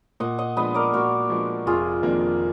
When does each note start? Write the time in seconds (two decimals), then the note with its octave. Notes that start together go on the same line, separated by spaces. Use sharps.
0.20 A#2 D#5 F#5
0.39 D#5 F#5
0.57 F3 G#3 B3 D4 B4 D#5
0.74 A#4 D5
0.93 A#2 F#4 A#4
1.29 F3 G#3 B3 D4
1.66 F1 F4 G#4
2.03 F2 D#3 A#3 D4